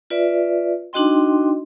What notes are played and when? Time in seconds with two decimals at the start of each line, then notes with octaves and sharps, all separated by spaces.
0.10 F4 B4 D5 E5
0.93 D4 D#4 F#4 D#5 G5 C6